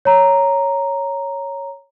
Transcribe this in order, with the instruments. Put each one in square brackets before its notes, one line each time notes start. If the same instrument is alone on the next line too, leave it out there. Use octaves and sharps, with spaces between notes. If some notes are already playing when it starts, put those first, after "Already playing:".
[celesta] C#5 A#5